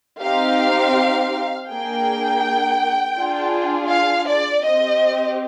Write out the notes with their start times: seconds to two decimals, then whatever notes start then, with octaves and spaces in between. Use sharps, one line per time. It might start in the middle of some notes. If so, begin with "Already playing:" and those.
0.22 C4 D#4 G4 F5
1.69 A#3 D4 G#4 G5
3.16 D4 F4 G#4
3.89 F5
4.26 D5
4.63 C4 G4 D#5